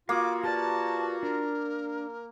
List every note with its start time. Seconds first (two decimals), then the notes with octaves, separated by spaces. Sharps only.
0.09 A#3 F4 F#4 F5 D6 D#6
0.44 G4 B4 D5 A5
1.23 D4 A#4